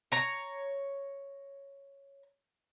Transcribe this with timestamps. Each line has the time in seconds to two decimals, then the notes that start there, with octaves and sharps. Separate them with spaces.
0.12 C#5 A#5